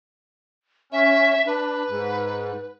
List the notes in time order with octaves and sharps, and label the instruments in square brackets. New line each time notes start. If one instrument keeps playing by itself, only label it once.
[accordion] C#4 [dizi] E5
[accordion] D4 [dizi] B4
[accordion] G#2